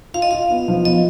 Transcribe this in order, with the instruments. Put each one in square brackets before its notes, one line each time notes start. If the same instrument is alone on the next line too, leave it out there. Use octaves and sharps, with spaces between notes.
[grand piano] F4 [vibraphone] F5
[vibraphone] D#5
[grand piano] F4 [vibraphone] F5
[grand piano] B3
F3
[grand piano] B3 [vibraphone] D#5